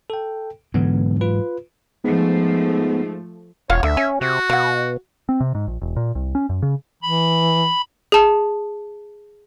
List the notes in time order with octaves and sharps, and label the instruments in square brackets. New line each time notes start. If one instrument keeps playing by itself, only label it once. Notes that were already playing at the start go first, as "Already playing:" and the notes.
[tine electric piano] A4 G5
[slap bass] G#2 E3 F#3 [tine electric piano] D3 B3
[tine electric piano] F4 B4
[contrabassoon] G#2 [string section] F3 A3 [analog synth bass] B3
[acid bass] E1 [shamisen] F4 F5 F#5 [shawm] C#5
[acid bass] D2 [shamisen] D3 [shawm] E5
[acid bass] C#4 [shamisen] G#5
[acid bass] C3 [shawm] F#4
[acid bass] B2 [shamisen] F5 F#5
[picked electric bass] C4
C3
G#2
A#1
E1
A#2
C2
C#4
F#2
C#3
[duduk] E3 [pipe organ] B5
[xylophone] G#4 A5